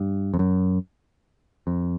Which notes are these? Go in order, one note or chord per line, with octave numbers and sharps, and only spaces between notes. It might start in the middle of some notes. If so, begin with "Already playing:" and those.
Already playing: G2
F2
F#2
F2